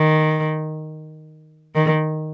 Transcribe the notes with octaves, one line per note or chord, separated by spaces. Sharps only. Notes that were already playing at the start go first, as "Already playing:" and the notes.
Already playing: D#3
D#3